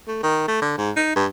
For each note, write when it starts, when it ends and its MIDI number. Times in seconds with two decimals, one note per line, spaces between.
0.08 0.19 57
0.23 0.43 51
0.48 0.61 57
0.62 0.73 50
0.77 0.91 44
0.96 1.14 63
1.16 1.26 43